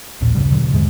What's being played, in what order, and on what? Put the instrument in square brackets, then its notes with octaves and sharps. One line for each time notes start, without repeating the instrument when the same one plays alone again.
[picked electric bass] A#1 D#2 A#2
D2 G2 C#3 G3
B2 D3 F#3
E2 G#2 C3 G#3